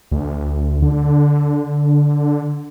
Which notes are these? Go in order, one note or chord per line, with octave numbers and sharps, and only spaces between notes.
D2
D3